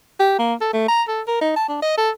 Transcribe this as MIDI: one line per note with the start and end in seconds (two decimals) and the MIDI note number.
0.20 0.34 67
0.39 0.54 58
0.61 0.71 69
0.73 0.86 57
0.88 1.03 82
1.08 1.21 69
1.27 1.39 70
1.41 1.53 63
1.56 1.66 81
1.69 1.78 62
1.82 1.93 75
1.97 2.11 69